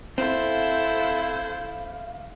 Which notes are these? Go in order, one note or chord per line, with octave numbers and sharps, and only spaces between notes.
C4 E4 A4 C5 F5